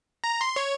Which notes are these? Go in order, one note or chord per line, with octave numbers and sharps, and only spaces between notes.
A#5
C6
C#5